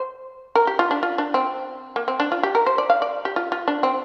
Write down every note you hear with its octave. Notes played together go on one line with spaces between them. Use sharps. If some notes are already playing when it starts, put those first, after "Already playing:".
Already playing: C5
A#4
G4
F4
D4
F4
D4
C4
A#3
C4
D4
F4
G4
A#4
C5
D5
F5
D5
G4
F4
F4
D4
C4